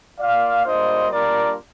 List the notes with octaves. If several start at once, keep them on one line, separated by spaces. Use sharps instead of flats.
A#3 F4 D5 F5
G3 A#3 D4 F4 C5 D#5
G3 A#3 D4 F4 A#4 D5